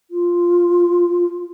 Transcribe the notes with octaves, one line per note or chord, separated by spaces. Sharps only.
F4